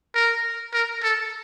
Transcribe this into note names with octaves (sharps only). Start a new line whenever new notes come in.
A#4
A#4
A4